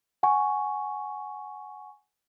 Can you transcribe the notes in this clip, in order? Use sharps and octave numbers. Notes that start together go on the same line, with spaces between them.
F#5 G#5 C#6